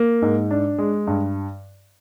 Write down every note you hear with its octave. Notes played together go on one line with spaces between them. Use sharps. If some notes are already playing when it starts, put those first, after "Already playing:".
Already playing: A#3
G#2
D4
G#3
G2